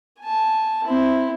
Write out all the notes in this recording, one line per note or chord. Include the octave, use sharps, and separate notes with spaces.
G#5 A5
C4 E4